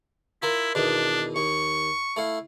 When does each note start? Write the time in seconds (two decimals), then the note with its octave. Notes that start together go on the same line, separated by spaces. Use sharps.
0.42 E4 F4 A#4
0.75 E2 B2 D#3 D4
1.36 D#2 C#6
2.16 A3 E4 F5